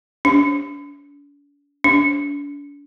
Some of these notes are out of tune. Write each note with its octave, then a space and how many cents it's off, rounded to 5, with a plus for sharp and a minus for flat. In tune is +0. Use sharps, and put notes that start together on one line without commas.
D4 -45
D4 -40